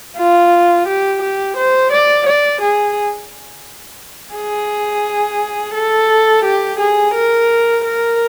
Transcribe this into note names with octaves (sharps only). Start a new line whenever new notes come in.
F4
G4
G4
C5
D5
D5
G#4
G#4
A4
G4
G#4
A#4
A#4